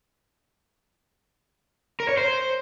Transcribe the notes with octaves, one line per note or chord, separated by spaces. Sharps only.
A#4
C#5
C5